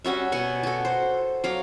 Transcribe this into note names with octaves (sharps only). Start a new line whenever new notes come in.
G3 C#4 F#4 E5
B2 F#5 G#5
F#4 A4
C5
F#3 F5 D6